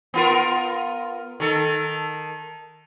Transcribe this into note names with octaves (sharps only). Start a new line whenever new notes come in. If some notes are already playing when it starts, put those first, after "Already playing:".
B3 F4 A#4
D#3 A4